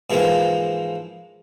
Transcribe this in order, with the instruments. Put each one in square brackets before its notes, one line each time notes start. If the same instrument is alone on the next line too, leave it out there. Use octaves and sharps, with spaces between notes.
[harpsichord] G#2 E3 F3 G#3 A#3